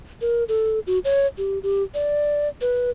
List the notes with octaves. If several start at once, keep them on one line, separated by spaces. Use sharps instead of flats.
A#4
A4
F#4
C#5
G4
G4
D5
B4